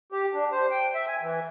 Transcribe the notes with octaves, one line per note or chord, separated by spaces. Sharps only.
G4
D4
C5
G5
E5
G#5
E3